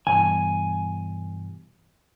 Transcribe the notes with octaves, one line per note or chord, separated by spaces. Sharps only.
G2 B2 E3 G#5